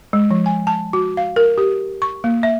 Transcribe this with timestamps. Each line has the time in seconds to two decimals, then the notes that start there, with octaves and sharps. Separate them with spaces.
0.13 G#3
0.31 F3
0.46 G#5
0.67 A5
0.93 F#4
1.17 F5
1.36 A#4
1.58 G4
2.02 C#6
2.24 A#3
2.43 E5